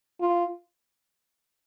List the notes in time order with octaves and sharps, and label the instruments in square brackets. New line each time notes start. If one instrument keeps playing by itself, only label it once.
[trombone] F4